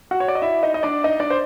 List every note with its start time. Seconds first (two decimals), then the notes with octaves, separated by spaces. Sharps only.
0.11 F#4 F#5
0.20 C#5
0.28 D5
0.35 D#5
0.42 E4 E5
0.63 D#4 D#5
0.74 D#5
0.83 D4 D5
1.04 D#4 D#5
1.20 D4 D5
1.30 C5